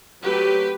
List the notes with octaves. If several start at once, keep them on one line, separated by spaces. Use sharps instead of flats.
F#3 A3 C4 G4 B4